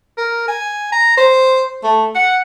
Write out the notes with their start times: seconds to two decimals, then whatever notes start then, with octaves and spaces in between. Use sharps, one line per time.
0.17 A#4
0.48 G#5
0.92 A#5
1.17 C5
1.84 A3
2.15 F#5